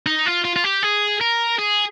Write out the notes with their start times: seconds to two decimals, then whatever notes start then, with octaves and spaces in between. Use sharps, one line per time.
0.06 D#4
0.26 F4
0.45 F4
0.56 F4
0.64 G4
0.83 G#4
1.21 A#4
1.59 G#4